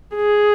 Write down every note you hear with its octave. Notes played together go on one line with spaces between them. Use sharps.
G#4